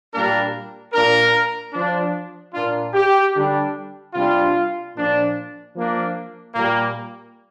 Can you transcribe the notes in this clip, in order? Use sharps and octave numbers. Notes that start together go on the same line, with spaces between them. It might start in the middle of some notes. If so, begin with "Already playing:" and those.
A#2 G3 A#3 D4 A#4
A#2 A#3 D4 A#4
F3 D4
A#2 A#3 D4 F4
G4
D3 G3 D4
C3 G3 D4 F4
A#2 F3 D4
F3 A#3 D4
A#2 G3 A#3